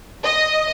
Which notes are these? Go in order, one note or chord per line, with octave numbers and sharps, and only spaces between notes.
D#5